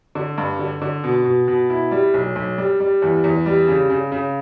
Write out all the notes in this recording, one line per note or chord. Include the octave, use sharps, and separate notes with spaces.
D3
G2
D3
D3
B2
B2
B2
E4
G3
B1
B1
G3
G3
E2
E2
G3
C#3
C#3
C#3